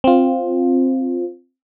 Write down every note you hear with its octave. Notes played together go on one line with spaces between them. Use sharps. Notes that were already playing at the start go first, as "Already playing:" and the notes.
C4 F4